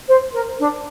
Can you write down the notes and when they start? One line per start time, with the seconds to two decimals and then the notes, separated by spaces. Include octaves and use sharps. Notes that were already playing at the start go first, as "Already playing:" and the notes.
0.08 C5
0.33 A#4
0.59 D4